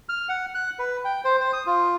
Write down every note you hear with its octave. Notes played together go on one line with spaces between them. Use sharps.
F6
F#5
F#6
B4
G5
C5
C5
D#6
F4